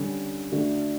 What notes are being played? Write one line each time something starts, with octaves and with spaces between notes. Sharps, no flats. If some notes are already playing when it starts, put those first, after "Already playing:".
Already playing: D3 G3 C#4
D3 A3 D4 F#4